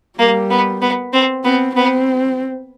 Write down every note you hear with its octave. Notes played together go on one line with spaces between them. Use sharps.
G3 A#3
B3
B3
C4
B3 C4
B3 C4